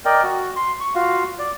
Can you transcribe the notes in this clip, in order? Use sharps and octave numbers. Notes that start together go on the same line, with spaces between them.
A#4 D5 D#5 G5
F#4
C6
C#6
F4 F#4 F5
D5